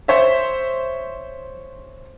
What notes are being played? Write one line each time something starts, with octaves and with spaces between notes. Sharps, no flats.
C5 C#5 E5